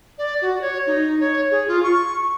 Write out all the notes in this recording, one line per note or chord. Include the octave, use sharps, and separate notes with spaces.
D5
F#4
C#5
D#4
C#5
G#4
F4
C#6